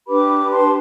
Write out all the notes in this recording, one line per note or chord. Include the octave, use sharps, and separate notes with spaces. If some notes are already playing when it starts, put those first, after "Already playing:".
D4 G4 B4 B5 D6
A5 C6